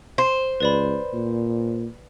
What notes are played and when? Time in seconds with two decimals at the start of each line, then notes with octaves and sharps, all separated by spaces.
0.18 C5
0.60 C#2 B4 D5 B5
1.13 A#2